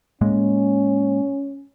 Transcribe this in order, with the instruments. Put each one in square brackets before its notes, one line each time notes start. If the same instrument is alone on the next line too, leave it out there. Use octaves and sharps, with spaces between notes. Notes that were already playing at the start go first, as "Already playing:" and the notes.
[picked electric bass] A2 G#3 A#3 [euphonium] C#4